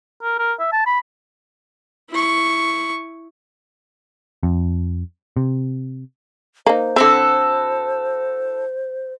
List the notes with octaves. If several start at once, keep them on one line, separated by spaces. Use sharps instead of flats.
A#4
A#4
E5
A5
B5
E4 C#6
F2
C3
A#3 D#4 C5
D3 C4 E4 F#4 A4